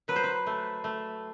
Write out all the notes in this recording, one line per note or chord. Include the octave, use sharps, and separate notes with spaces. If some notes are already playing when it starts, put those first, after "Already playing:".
F#3 B4
C5
B4
A3
A3